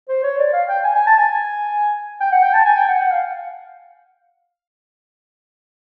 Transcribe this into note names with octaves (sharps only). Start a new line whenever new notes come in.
C5
C#5
D5
F5
G5
G#5
G#5
A5
G#5
G5
F#5
G5
A5
G#5
G5
F#5
F#5
F5